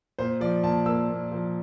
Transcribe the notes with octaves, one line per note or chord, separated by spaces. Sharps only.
A#2 C5
F3 D5
A#2 A5
A#3 E6
A#2
F3